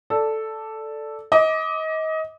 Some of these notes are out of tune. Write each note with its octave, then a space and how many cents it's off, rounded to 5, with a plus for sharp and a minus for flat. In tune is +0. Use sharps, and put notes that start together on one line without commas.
A4 +0 D5 +0
D#5 +25 D6 +0